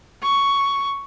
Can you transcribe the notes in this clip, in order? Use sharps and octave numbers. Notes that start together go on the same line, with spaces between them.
C#6